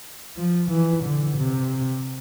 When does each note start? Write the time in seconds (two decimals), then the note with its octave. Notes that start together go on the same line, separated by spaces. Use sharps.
0.37 F3
0.70 E3
1.04 D3
1.37 C3